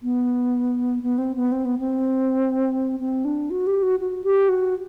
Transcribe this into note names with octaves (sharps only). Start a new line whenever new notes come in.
B3
B3
C4
B3
C4
B3
C4
C4
D4
F#4
G4
F#4
F#4
G4
F#4